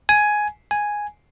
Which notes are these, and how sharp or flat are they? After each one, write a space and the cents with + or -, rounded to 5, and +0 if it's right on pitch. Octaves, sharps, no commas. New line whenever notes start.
G#5 +10
G#5 +0